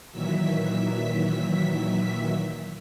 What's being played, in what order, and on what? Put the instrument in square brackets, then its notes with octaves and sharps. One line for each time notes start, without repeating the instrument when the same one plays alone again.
[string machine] A#2 D#3 E3 F#3 E5 B6